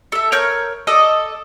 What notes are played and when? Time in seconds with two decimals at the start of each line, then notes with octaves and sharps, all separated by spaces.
0.12 A4 E5
0.32 A#4 C#5 F6 G6
0.87 A4 D5 D#5 D#6